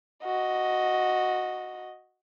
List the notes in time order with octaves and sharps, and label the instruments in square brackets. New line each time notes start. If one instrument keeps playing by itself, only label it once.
[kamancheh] F#4 D#5